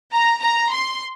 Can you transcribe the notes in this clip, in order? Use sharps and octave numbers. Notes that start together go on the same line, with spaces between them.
A#5
A#5
C6